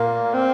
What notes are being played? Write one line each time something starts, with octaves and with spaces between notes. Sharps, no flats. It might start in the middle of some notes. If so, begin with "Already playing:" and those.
Already playing: A#2 A#3
C4